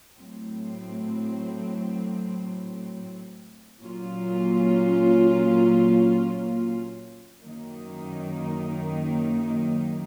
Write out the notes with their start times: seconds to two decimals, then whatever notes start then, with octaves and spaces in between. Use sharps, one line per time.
0.17 A2 F#3 C4
3.80 A#2 F#3 A#3 C#4 F4
7.43 F#2 D#3 A#3 D#4